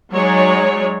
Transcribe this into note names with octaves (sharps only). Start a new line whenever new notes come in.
F#3 G#3 D#4 C#5 D5